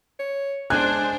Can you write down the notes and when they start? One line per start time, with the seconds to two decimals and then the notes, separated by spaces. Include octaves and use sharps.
0.19 C#5
0.70 G#3 D4 C5 G#5 F#6